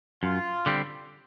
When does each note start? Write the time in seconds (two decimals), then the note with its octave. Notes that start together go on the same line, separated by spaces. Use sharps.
0.23 F#2 F4
0.66 D3 G3 C4